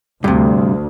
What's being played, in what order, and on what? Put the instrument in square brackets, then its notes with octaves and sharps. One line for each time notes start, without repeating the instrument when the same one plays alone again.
[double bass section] D2 [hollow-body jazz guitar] G2 C3